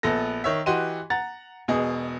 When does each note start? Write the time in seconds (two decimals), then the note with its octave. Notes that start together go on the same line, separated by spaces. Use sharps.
0.03 A#1 B3 A4 A#6
0.44 D#3 C#5 E5
0.66 E3 F#4 G4 D#5 C6 D#7
1.10 F#5 A#5 A6
1.68 E1 B2 G#4 D#5